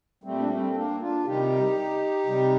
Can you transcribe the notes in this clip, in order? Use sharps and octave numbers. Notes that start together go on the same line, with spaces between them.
A#2 G3 A3 C4
D4
A3 C4
A#3 D4
D4 F4
C3 D#3 G3 D#4 G4
C3 G3